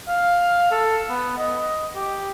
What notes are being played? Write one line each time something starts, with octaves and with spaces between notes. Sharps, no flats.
F5
A4
B3
D#5
G4